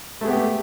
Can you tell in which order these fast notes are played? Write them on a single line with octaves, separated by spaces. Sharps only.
A3 G#4 B3 G4